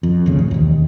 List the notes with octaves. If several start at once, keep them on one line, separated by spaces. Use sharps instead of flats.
F2
G1 D2 C#3
A1
E1 D#2